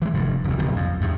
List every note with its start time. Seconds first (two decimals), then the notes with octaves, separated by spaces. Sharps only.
0.02 E3 G#3
0.14 F1 G2
0.44 F1 D2
0.58 F#1 B1 G2
0.76 F2
1.01 E2 G2